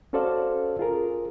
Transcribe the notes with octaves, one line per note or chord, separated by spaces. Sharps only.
C#4 F#4 A4 C5 D5 F5
F4 G#4 A#4